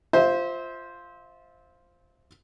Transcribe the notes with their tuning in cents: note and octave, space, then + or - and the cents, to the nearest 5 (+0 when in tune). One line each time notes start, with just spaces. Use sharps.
F4 +0 C5 +0 E5 -30